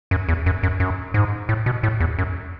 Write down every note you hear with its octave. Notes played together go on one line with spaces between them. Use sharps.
F#2
E2
F#2
F#2
F#2
G#2
A2
B2
A2
E2
F#2